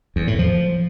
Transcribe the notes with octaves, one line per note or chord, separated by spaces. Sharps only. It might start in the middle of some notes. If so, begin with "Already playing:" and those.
E2
A2
F3